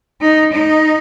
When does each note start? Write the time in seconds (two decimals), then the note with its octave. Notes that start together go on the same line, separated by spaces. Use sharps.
0.21 D#4
0.53 D#4